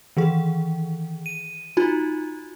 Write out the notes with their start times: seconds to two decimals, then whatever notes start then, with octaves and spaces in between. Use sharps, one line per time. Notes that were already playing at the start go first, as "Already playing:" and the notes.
0.17 D#3 E3 G#4
1.26 D#7
1.77 D#4 F4 F#4